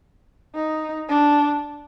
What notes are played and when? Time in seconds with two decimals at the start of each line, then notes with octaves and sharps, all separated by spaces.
0.55 D#4
1.09 D4